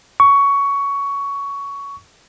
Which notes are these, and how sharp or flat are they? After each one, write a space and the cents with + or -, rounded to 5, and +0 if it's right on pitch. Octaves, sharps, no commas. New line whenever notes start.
C#6 +15